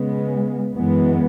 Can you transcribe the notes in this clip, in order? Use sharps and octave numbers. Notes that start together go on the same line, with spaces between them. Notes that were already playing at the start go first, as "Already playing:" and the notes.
Already playing: C#3 G#3 B3
F#2 E3 G#3 B3